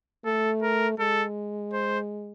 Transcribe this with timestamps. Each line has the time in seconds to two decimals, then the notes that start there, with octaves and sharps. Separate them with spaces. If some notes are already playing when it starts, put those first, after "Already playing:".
0.25 A3 A4
0.62 A#4
0.99 G#3 A4
1.73 C5